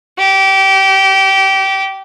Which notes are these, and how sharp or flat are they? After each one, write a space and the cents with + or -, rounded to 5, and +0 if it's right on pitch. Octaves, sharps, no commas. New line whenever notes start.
G4 -25